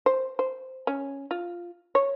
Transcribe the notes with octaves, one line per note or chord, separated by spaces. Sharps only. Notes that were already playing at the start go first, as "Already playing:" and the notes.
C5
C5
C#4
F4
C#5